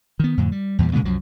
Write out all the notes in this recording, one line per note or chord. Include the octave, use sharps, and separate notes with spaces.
D#3 B3
F2 A2 D3
G3
E2 A#2 E3 G3
A#2 C#3 G#3 B3
C2 F#2 F3 F#3